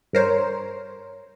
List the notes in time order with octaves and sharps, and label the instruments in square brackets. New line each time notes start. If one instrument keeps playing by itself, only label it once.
[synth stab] G2 A#4 C5 C#5